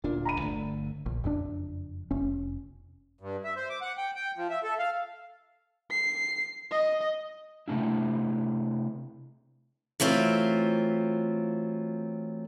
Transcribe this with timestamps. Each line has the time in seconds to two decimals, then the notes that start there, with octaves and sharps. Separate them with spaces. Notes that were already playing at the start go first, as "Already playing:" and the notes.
0.04 D1 A#2 D4
0.25 A#5 B5 D#7
0.40 G1 D3 A3
1.06 A#1
1.24 F#1 F2 A2 D4
2.11 F1 C#4
3.21 G2
3.44 E5
3.56 C5
3.70 D6
3.81 F#5
3.98 G5
4.15 G5
4.37 F3
4.50 E5
4.64 A4
4.79 F5
5.91 C7
6.72 D#5
7.68 C3 A3 D4 E4
10.00 E3 F#3 A3 C4 F4